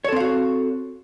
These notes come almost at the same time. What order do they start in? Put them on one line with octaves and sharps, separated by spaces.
C#5 A4 C4 F5 F#4